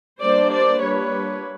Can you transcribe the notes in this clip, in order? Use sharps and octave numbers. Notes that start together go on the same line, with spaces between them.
G3 A#3 D4 C5 D5
C5 D5
G3 A#3 D4 F4 B4 C#5